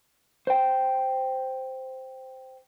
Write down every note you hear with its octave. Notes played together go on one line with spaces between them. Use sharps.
C5 G5